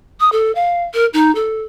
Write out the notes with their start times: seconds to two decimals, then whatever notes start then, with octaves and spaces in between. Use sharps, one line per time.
0.20 D#6
0.32 A4
0.55 F5
0.94 A#4
1.13 D#4
1.35 A4